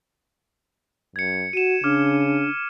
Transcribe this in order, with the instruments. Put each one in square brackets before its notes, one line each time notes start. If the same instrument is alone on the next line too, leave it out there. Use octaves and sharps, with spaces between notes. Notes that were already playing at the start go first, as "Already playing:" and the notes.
[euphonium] F#2 [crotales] G#6 C#7
[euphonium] F#4 [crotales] D#7 E7
[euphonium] C#3 [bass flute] D4 [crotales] D6 F6